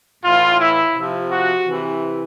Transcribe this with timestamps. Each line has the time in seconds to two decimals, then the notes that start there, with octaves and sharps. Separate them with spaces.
0.23 A2 E3 F4
0.59 E4
0.94 C3 F3
1.31 F#4
1.66 C3 E3